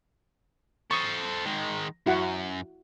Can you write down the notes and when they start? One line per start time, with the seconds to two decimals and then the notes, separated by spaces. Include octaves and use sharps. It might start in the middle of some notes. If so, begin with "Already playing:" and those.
0.91 A4 C5 C#6 D#6
1.45 D#3 G#3
2.06 F#2 E4 F#4 F#5